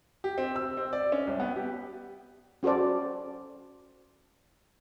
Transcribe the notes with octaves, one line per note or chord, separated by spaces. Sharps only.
G4
C4
E6
C4
D5
C#4
C2
B3
G4
C#4 F#4 A4 C5 D5